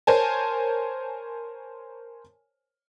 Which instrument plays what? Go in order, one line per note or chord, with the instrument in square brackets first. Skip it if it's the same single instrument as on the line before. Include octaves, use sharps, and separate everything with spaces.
[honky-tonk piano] A#4 C5 C#5 G#5 A5